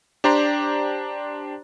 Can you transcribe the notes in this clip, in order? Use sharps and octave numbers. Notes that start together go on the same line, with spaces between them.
D4 G4 C5 D5 A#5 C6